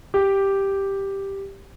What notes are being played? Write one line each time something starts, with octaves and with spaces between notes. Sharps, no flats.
G4